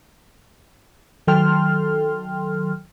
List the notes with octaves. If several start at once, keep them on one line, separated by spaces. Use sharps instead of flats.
D#3 F#3 A4 G5 C6 F6